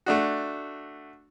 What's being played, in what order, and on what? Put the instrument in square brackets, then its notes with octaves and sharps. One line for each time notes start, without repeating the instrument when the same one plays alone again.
[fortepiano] A3 D4 F#4